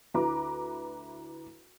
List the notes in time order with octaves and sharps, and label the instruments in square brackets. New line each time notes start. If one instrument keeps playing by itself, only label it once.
[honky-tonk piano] D2 E4 B4 A#5 D6